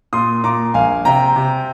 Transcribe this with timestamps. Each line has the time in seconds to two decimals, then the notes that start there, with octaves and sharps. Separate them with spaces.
0.13 A#2 C6 D#6
0.44 A#2 A#5 D6
0.74 A#1 F5 G#5
1.05 C3 G5 A#5
1.36 C3